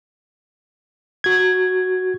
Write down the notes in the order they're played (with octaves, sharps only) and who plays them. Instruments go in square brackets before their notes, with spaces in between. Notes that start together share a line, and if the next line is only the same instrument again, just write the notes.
[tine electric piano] F#4 G#6